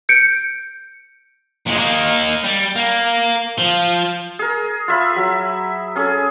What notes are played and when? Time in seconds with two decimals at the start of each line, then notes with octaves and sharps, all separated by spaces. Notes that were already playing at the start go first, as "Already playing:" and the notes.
0.09 G6 C#7 D7
1.67 A#2 G#3
1.80 A#3 D#4
2.44 G3
2.76 A#3
3.59 F3
4.39 G#4 A#4
4.88 F4 E5 B5
5.16 F#3 E5
5.96 C#4 G#4 A4